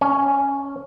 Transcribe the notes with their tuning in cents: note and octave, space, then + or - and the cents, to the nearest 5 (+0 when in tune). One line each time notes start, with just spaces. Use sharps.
C#4 +0